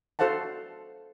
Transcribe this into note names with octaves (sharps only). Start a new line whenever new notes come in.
F#4 A4 C5 F5 F#5 A5